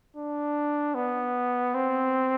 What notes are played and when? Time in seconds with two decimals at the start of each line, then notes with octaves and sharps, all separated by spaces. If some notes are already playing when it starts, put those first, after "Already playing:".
0.17 D4
0.95 B3
1.74 C4